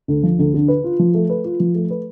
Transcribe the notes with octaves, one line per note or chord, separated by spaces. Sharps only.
D2
F3
D2
D3
B4
F4
F3
A3
B4
F4
F3
A3
B4